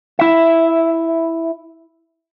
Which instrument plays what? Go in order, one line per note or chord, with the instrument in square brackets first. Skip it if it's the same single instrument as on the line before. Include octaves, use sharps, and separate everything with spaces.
[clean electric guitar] E4 E5